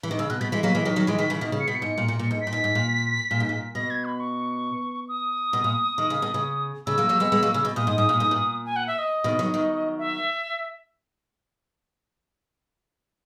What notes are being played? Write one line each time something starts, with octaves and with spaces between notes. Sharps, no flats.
E3
D#3
C#3 E6
B2 F#6
B2 B6
E3 G#3 B6
F#3 A#3 B6
E3 G#3
D#3 F#3
D#3 F#3
E3 G#3
D#3 F#3
C#3 E3
B2 D#3
C#3
C#7
B2 B6
C#7
G#2
A#2
A#2
A#2
G#2
B6
A#2
G#2
G#2
A#2
A#2
G#2
A#2
B2 A#6
G#6
B5
C#6
D#6
B2
A#2
D#3
C#3
B2
C#3
C#3 E6
F#3 A#3
F#3 A#3
G#3 B3
G#3 B3
F#3 A#3
C#3
B2
A#2 D#6
G#2
G#2
A#2
G#2
A#2
G#5
F#5
E5
D#5
B2 D#3
D#3 F#3
D#3 F#3
E5